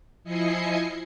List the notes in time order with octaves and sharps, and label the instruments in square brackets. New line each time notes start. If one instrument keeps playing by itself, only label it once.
[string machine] F3 E4 D#5 G#5 C7 C#7